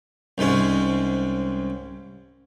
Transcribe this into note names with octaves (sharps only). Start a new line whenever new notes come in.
C2 G#2 G#3 C#4